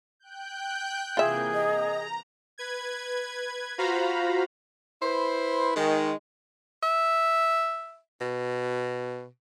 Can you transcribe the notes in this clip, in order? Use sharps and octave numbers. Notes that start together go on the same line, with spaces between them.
G5 F#6 G6
C3 E3 A#3 F4 G#4 E5
D#5 A#5
B4 G#6
F4 F#4 C5 F5 A#5 B5
E4 B4 C5
D#3 G#3
E5
B2